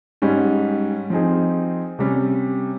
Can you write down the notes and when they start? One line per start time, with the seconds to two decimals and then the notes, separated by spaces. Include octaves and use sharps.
0.22 G#2 G3 C#4
1.10 F3 C4 D#4 G#4
1.99 C3 G3 C#4